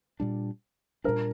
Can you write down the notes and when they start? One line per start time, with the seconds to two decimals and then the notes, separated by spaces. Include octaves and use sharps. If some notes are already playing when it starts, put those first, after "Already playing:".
0.20 A#2 G3 D4
1.04 A#2 G3 D4 A#4